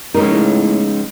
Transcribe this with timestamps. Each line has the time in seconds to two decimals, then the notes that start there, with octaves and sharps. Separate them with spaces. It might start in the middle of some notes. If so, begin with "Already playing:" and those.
0.15 G#3 C#4 D#4 A#4
0.31 A2